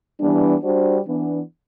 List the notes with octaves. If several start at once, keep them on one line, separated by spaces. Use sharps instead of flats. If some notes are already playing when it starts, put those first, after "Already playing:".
E3 G3 B3 D4
G3 D4 F#4 C5
E3 B3 D4